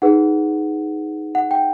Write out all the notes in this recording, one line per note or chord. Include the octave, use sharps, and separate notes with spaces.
D#4 G#4 B4 F#5
F#5
G5